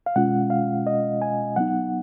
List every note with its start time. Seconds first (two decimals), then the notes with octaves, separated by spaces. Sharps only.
0.06 F5
0.16 B2 G#3 C#4 F4 F#5
0.50 F5
0.87 D#5
1.22 G#5
1.56 F#3 B3 D#4 F#5